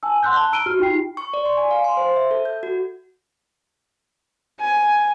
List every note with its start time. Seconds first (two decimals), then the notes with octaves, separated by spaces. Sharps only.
0.03 G#5 A5 E6
0.23 F#5 C6 E6 F#6 G6
0.36 A5 F#6 G7
0.52 A#5 E6 D7 D#7 G7
0.66 F#4 G4 F6
0.79 D#4 F4 G4 G5 C7
1.17 C#6
1.34 D5
1.46 C6
1.57 G#5
1.71 F5
1.84 C6
1.97 C5
2.16 E5
2.31 A4
2.45 G6
2.63 F#4
4.60 G#5